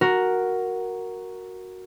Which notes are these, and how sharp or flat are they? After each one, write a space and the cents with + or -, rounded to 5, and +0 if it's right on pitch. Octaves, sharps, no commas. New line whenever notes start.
F#4 +0 A#4 +0